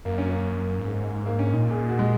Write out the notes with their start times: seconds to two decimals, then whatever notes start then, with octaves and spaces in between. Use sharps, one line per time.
0.05 F#2 A#3
0.18 C#4
0.30 A#3
0.79 G#2
1.26 A#3
1.39 C#4
1.53 A#2 D#4
1.71 G#4
1.89 F#4
1.99 G#3